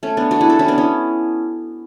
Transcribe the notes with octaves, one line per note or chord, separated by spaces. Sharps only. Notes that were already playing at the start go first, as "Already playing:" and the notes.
A3 C#4
B3 D4
D4 F#4
E4 G#4
F#4 A4
C#4 E4
B3 D4
C#4 E4